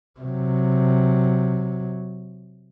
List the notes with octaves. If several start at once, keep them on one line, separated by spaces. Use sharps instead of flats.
C3 F#3